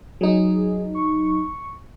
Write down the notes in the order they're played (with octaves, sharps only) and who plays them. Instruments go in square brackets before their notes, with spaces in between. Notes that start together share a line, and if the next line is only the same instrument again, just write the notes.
[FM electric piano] F#3 D#4 [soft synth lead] G#4
[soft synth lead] C#6